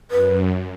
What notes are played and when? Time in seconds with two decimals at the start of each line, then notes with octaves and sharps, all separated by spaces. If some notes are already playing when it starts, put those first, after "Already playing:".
0.10 F#2 B4